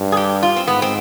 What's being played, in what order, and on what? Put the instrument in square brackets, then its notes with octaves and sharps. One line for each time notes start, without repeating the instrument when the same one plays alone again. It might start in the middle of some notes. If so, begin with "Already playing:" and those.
Already playing: [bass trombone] G2
[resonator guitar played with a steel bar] G#4
G4
F4
C4
[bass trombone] G#2 [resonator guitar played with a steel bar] B3
[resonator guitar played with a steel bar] C4